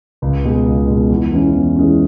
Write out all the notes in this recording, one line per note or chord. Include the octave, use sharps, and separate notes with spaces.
C#2
B2 G#3
C#2
B2 G#3
E2
E3 G#3 C#4
E2
E3 G#3 C#4